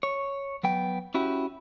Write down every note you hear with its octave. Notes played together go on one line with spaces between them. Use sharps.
C#5
F#3 B3 G5
C#4 E4 F#4 G4